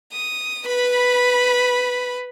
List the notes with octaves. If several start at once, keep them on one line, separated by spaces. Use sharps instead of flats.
D#6
B4 B5